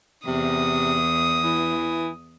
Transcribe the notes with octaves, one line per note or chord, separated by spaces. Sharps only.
E2 C3 D#6
E3